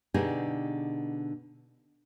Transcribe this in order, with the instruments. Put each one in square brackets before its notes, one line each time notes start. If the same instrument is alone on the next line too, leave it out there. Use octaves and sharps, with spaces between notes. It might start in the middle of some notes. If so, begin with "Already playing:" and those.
[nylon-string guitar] B2 D3 D4 D#4 G4 G#4